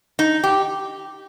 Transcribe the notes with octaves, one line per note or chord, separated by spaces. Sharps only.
D#4
G4